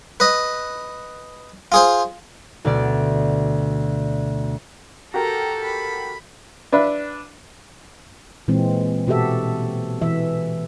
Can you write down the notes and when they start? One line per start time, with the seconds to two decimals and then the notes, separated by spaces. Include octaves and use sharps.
0.20 B4 D#5
1.72 F4 G#4 C5
2.65 D2 B2 D5
5.14 F#4 G4 A4 A#4 A#5
5.63 B5
6.72 D4 B4 E5
8.48 A#2 E3 G#3 C4
9.07 B2 F#4 G4 A4 E5
10.02 E3 E5